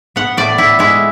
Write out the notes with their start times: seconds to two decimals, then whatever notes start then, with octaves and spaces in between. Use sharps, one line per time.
0.16 B3 F#5
0.37 A2 D5
0.58 A2 E4
0.79 G#3 E4